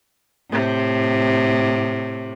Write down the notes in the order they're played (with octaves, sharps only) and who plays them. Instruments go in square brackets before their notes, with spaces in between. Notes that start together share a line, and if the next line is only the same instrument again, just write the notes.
[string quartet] A2 C3